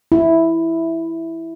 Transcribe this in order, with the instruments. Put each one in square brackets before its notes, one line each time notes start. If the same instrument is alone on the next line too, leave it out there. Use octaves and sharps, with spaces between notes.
[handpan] E4